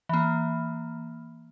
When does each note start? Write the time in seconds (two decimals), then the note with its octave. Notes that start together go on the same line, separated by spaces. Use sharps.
0.09 E3 A#3